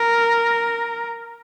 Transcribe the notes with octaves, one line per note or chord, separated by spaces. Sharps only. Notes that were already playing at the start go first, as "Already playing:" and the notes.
Already playing: A#4